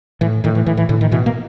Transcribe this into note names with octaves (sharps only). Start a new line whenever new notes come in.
A2 E3
A2 D#3
E3
A2 E3
E3
A2 D3
D#3
B2 E3
A#3